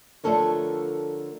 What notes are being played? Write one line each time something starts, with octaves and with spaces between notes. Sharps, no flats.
D3 F3 A3 A4 A#4 C#5